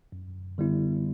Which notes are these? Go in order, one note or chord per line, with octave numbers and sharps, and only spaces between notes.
F#2
D3 G3 B3 E4